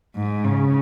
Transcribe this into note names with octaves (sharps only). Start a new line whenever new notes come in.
G#2
C#3